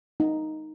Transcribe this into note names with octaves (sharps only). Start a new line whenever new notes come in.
D#4